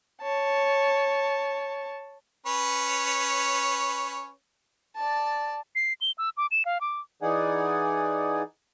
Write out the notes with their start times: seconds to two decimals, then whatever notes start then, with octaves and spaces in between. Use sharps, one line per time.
0.22 C#5 A5
2.46 C#4 B4 C#5
4.96 D5 A5
5.75 C7
6.01 G7
6.18 E6
6.37 D6
6.51 E7
6.65 F5
6.81 D6
7.22 E3 D#4 G#4 D5 F#5 G#5